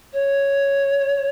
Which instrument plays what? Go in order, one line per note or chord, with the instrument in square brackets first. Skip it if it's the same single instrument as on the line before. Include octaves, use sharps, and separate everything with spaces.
[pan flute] C#5